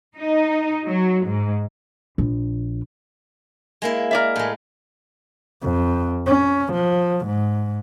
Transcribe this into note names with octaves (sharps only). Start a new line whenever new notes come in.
D#4
F#3
G#2
A#1
G#3 A#3 E4
A#4 D5 E5
A2 G#3
F2
C#4
F3
G#2